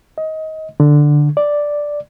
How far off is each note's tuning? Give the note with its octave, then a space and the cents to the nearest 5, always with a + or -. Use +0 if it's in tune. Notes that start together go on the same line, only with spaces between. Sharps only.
D#5 +20
D3 +5
D5 +0